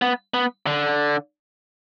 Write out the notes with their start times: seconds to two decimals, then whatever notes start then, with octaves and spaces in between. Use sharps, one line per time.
0.02 B3
0.34 B3
0.67 D3